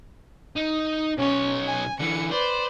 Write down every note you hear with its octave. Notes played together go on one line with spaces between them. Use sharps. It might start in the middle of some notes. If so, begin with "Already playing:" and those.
D#4
B1 C#4 C#5
G#5
D3 E3 C#7
B4 C5 D5